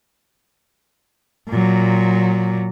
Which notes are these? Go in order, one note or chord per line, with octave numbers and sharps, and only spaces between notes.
A#2 F#3